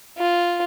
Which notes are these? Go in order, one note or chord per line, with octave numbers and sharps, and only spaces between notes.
F4